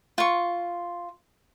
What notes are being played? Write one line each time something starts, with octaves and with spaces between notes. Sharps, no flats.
F4 C#6